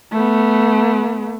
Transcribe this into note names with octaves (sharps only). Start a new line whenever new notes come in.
A3 B3